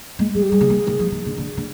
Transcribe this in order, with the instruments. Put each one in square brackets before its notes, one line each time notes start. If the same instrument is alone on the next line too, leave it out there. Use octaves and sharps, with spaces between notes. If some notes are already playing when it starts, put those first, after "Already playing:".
[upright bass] G#3
[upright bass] G3 [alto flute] G#4
[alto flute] G4
[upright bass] G3 [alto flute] G#4
[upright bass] D3
D#3
D#3
F3
D#3
D3
D3
D3